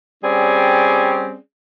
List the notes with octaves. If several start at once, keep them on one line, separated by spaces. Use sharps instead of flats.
G3 C4 C#4 G#4 D5